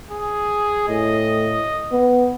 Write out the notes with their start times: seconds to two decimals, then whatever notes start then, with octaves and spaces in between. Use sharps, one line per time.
0.11 G#4
0.89 A2 D#5
1.92 B3